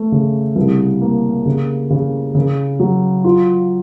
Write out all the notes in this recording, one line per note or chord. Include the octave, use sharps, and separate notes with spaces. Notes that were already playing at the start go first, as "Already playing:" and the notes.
Already playing: A3
C#3
C2
A#3
C#3
C#3
C#3
F#3
F4